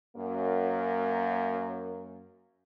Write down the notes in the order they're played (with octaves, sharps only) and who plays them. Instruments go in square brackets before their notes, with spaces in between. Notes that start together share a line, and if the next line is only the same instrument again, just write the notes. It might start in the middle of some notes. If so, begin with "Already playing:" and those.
[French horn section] F#2 A#3